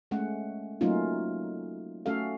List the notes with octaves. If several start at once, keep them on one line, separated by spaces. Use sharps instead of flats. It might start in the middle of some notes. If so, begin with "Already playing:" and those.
G#3 A3 C#4 F#5
F#3 A3 A#3 C#4 D#4 F4
A3 C#4 F#4 A4 F5